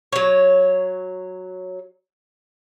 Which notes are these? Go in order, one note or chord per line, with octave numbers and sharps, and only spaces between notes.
F#3 C#5